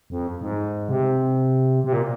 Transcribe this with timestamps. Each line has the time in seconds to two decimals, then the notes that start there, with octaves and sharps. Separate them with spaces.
0.10 F2
0.41 G#2
0.89 C3
1.84 C3
1.93 A#2